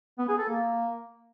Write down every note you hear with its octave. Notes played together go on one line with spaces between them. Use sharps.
B3
G#4
A4
A#3